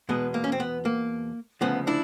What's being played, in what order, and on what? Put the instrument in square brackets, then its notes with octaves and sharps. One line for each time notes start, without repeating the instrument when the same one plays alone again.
[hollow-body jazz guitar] E2 B2 G#3 B3
A#3
C#4
C4
B3
A#3
D2 C#3 F3 B3
D4 E4